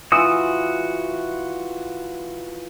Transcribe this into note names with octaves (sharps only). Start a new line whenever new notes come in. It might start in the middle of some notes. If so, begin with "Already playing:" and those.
E3 F4 F#4 D#6 E6